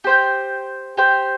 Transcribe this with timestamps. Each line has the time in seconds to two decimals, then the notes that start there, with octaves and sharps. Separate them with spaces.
0.04 G4 C5 G5
0.97 G4 C5 G5